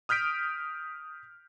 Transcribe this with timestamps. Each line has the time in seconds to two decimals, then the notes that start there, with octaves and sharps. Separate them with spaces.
0.09 D#6 F6 G6 B6 D7